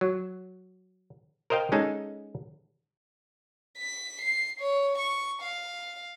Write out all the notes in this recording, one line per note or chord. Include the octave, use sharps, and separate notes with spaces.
F#3
A#4 C5 D#5 F5 G5
G#3 C#4 D#4 G#4 A4
B6
C7
C#5
C#6
F5